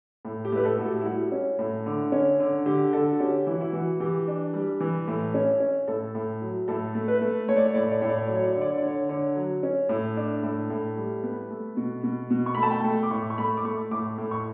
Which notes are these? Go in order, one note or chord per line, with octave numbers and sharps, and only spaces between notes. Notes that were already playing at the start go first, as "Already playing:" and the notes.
A2
G4
A2 B4
A4
A2 F#4
G4
E4
G3 F#4
C#4
A2
D3
C#4
D3
D3 G4
D3 A4
F#4
C#4 G4
E3 E4
F#4
E4
E3 F#4
E3 G4
D4
G3
E3
A2
C#4
C#4
A2 A4
A2
F#3
A2 A4
A3
B4
A3
A3 C#5
D5
C#5
A2 D5
C#5
D5
A2 C#5
D5
C#5
F#3 D5
C#5
D5
D3 C#5
D5
C#5
D5
D3
C#5
D3 C#5
F#3
C#4
A2
D4
A2
A2
G3
B3
A3
B2
B2
B2
C#6
A3 B5
A5
G5
A3
D6
A2 C#6
C#6
A3 B5
D6
A3 C#6
A2 D6
A2
C#6